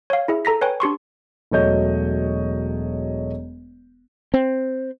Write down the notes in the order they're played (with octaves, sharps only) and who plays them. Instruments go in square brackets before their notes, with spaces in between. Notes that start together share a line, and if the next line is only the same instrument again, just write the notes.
[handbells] C#5 F5
E4 G#4 E5
A4 A#5 A#6 B6
B4 C#5 G5 G#5
D4 G4 C6 C#6
[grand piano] E1 F#3 A3 C#5 D#5 G6
[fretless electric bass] C4